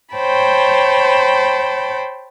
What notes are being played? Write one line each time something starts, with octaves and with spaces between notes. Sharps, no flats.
C5 C#5 G5 A5 B5